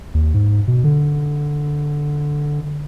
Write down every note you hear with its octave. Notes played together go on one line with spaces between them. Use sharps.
D#2
G#2
B2
D3